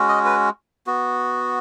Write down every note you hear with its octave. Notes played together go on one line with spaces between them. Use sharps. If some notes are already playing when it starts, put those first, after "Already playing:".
Already playing: G#3 C#4 F#4
D#5
B4
B3 F#4